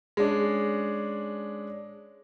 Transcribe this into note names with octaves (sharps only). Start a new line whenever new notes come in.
G#3 C#4 D4